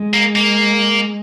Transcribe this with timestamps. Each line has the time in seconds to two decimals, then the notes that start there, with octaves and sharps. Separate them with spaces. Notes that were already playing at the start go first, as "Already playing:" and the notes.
Already playing: G#3
0.14 A#3
0.36 A#3